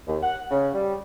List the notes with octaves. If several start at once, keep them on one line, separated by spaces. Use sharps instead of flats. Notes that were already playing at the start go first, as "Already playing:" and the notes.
D#2
F#5
C#3
G3